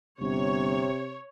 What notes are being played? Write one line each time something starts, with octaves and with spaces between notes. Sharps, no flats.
G1 C3 C#5